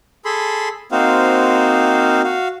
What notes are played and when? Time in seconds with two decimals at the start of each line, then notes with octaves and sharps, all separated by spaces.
0.25 G#4 A4 B5 C6
0.92 A#3 C4 D#4 F#4 C5 F5
2.24 F#4 F5